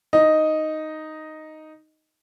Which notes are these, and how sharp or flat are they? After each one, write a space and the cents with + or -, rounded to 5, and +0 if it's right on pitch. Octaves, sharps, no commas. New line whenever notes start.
D#4 +0 D#5 +0